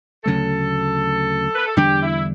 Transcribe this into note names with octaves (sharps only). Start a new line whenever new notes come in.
D2 C#3 F#3 A3 A4
B4
A4
E2 D3 G3 D4 G4
E4